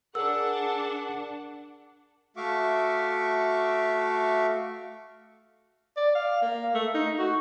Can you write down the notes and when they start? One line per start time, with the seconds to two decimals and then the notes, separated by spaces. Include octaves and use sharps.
0.15 D4 G#4 A#4 F#5 E6
2.37 A3 F#4 E5 F5 C#6 D6
5.97 D5
6.15 F5
6.42 A#3
6.74 A3
6.94 D#4
7.19 F#4